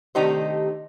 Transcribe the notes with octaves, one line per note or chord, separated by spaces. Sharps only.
C3 D#3 A3 D#4 G4 C5